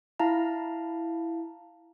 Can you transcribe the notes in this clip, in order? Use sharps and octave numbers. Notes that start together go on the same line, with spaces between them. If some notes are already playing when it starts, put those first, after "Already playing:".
E4 F5 A5 A#5